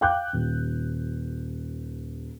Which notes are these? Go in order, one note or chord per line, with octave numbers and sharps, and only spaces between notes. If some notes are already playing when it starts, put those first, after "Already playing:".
F5 G5 D6 F#6 G6
D#1